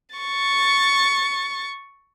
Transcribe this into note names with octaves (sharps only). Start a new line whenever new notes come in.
C#6 A6